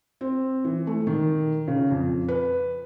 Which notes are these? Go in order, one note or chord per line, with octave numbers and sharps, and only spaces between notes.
C4
E3
A3
D#3
C#3
F2
B4